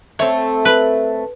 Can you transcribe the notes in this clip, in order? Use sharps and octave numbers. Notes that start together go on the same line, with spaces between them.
A3 C4 C#5
B4